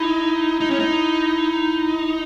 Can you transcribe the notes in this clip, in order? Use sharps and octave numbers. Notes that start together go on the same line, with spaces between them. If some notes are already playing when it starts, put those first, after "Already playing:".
Already playing: D#4 E4
D#4
C#4
D#4